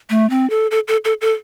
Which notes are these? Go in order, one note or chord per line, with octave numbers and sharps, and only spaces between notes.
A3
C4
A4
A4
A4
A4
A4